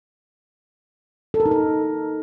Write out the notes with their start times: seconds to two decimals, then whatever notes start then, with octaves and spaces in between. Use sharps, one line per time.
1.34 A4
1.40 A#4
1.46 D#4
1.51 A#4